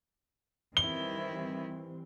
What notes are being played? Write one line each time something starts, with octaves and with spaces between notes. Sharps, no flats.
D#3 E3 G3 C4 E4 G7